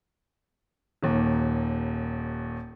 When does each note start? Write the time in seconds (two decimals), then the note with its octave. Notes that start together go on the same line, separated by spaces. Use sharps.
1.03 D#1 D#2